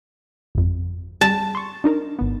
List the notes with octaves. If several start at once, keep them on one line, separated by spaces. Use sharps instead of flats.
G#1 F2
G3 A5
C6 C#6
D4 D#4 A#4
G#1 B3